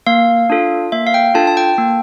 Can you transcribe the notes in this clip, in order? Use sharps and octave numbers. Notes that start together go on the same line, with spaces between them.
A#3 F5
D4 F4 A4
A#3 E5
F5
G5
D4 F4 A4 A5
A5
G5
A#3